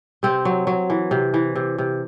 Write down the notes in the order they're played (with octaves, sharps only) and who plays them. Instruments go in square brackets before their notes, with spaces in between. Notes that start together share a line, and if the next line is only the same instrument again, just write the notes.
[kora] C3 C4
F#3
F#3
E3
C3
E3
C3
C3